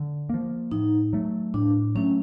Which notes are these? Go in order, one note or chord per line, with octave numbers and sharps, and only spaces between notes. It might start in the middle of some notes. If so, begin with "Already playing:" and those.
Already playing: D3
F3 A#3
A2 D#4
F#3 A3
A2 D4
F#3 A3 C#4